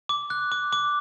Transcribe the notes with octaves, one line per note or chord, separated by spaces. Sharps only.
D6
F#6
D6
D6